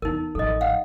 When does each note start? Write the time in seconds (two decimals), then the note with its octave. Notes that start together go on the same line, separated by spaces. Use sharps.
0.02 E2 D#4 A#4
0.35 A1 F3 A4 D#5
0.61 F5 F#5